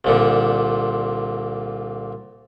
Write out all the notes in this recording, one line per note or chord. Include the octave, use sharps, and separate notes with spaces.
C2 A#2 D3